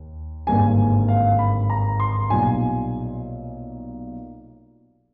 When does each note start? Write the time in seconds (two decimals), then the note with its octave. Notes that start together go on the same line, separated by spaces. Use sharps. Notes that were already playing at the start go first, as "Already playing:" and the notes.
Already playing: D#2
0.47 G#1 G2 D3 G3 A#3 G#5
1.08 F5
1.39 B5
1.70 A#5
2.00 C6
2.30 B1 A#2 G3 A#3 G#5